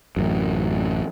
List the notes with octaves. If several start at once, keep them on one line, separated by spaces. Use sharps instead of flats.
A1 F#2